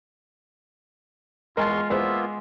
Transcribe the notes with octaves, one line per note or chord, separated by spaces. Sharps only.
E2 G#3 F4 A#4 G#5 A5 C6 C#6
E2 A#3 B3 F4 B4 C5 E5